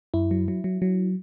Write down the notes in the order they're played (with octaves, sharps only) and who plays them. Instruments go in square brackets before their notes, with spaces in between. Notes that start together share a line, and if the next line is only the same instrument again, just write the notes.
[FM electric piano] F#2 E4
F#3
F#3
F#3
F#3